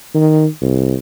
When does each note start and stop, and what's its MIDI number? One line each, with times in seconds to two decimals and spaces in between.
0.14 0.47 51
0.62 0.96 36